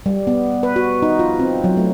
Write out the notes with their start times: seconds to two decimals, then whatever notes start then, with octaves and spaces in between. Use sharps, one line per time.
0.06 G3
0.27 B3
0.63 B4
0.76 F#4
1.02 D#4
1.19 F4
1.39 C4
1.64 F#3
1.77 A3